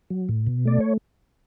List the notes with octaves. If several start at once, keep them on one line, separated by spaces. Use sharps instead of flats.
F#3
A2
B2
A3 D5
C#5